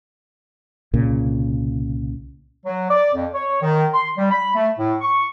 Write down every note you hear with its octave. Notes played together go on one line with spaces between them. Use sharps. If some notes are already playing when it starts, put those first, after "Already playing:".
C2 A#2 C#3
F#3
D5
F2
C#5
D#3
C6
G3
B5
A3
A2
C#6